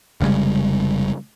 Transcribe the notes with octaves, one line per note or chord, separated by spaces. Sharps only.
F1 C#3 G3 G#3